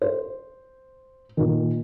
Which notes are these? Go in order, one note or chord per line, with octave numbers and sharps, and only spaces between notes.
C5
A#2 D#3